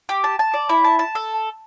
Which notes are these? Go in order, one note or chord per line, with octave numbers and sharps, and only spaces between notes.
G4
A5
A5
D5
E4
A5
A5
A4